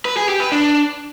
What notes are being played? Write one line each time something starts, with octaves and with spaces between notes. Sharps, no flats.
B4
G#4
G4
B4
D4